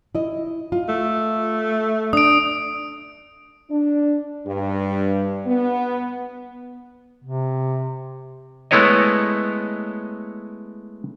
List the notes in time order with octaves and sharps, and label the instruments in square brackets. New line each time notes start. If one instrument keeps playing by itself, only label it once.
[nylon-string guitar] E4 D#5
F4
[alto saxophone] A3
[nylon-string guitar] D4 [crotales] D#6 D7
[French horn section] D4
G2
B3
[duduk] C3
[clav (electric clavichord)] G#3 A3 B3 E4 C#5 D#5